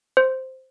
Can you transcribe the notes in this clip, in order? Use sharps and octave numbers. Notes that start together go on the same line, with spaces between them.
C5